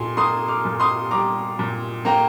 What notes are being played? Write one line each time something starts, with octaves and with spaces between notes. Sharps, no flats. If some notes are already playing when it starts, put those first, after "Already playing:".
Already playing: A#2 G#5 C6
A#3 C6 D#6
D6 F6
A#2
C6 D#6
G3 A#5 D6
A#2
A#3 G5 A#5